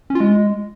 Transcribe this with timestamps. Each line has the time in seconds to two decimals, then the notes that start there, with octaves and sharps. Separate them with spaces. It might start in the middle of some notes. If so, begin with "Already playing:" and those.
0.10 C#4
0.15 F4
0.20 G#3